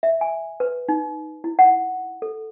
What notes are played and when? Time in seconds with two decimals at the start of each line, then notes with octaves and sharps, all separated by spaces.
0.03 E5
0.21 G#5
0.60 B4
0.89 D#4
1.44 E4
1.59 F#5
2.22 A4